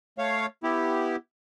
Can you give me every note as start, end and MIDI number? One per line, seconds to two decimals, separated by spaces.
0.18 0.46 57
0.18 0.46 73
0.18 0.46 77
0.63 1.16 59
0.63 1.16 64
0.63 1.16 67